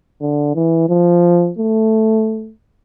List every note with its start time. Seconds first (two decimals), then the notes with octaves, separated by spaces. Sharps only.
0.20 D3
0.54 E3
0.89 F3
1.58 A3